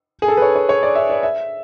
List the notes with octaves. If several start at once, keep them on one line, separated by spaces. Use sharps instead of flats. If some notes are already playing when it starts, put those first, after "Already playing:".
G#4
A4
B4
C#5
C#5
C#5
D5
E5
D5
E5